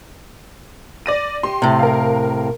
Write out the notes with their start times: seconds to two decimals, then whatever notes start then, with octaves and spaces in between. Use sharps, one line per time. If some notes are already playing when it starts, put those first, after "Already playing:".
1.06 D5 A#6 D#7
1.43 G4 C6
1.62 A2 C3
1.79 A#4 F5